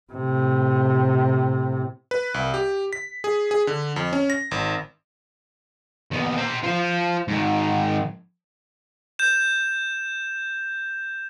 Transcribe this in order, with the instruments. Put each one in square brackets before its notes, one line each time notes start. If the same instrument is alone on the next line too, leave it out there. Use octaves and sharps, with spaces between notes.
[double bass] A2 C3
[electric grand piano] B4
C2
G4
B6
G#4
G#4
D3
F2
C#4
A#6
G#1
[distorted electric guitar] D#2 B3
C5 A#5
F4 C5
G#2 D#3
[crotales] G6 E7